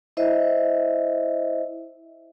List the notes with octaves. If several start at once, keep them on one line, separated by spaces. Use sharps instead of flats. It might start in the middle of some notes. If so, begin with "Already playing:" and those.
E4 C5 D#5 E5